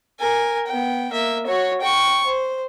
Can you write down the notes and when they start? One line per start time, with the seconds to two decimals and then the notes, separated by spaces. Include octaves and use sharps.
0.20 A#4 G#5
0.67 B3 G5
1.12 A#3 E5
1.46 F#4 C#5
1.81 G5 C#6
2.26 C5